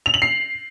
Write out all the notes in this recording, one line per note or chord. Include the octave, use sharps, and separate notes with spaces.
F7
F#7
C7